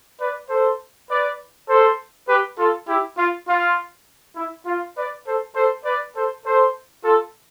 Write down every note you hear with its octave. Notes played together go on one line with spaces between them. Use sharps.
B4 D5
A4 C5
B4 D5
A4 C5
G4 B4
F4 A4
E4 G4
F4
F4
E4
F4
B4 D5
A4 C5
A4 C5
B4 D5
A4 C5
A4 C5
F4 A4